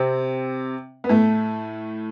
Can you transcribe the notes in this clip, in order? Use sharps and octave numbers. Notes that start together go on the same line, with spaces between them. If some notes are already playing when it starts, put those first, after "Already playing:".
Already playing: C3 C4
B3
A2 A3